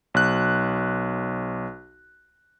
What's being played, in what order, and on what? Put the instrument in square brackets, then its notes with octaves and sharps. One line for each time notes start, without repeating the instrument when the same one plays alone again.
[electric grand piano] B1 F#6